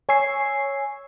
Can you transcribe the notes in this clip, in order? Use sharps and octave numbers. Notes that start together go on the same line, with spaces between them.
C#5 G#5 C#6 E6 C7